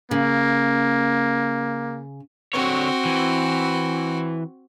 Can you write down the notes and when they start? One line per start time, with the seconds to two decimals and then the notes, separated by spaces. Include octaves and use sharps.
0.11 C#3 A#3
2.53 D3 C4 F#4 C#5
3.05 E3